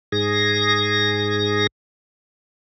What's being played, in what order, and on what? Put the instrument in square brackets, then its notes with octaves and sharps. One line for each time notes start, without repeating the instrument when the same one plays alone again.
[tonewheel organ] G#2 G#4 A#6